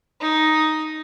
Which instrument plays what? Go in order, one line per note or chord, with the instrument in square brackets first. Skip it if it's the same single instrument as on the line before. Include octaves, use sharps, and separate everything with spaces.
[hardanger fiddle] D#4